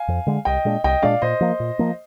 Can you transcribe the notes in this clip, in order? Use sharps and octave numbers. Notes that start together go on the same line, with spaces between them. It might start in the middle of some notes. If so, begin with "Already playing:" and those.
Already playing: F5 G#5
F2
D3 G#3
C2 D#5 G5
A#2 G#3 D4
C2 D#5 G5
A#2 G#3 D4 D5 F5
A#2 C5 D#5
F3 A#3
A#2
F3 A#3